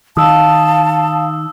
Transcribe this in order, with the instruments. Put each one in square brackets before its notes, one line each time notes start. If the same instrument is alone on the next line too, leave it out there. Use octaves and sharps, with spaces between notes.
[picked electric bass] D#3 [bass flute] F5 [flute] A5 [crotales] D#6 E6